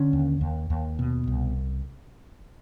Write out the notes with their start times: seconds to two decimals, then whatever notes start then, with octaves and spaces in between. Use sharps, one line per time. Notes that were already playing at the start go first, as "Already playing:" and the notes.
Already playing: D3 C#4
0.13 D#2
0.41 D#2
0.70 D#2
0.99 B2
1.27 C2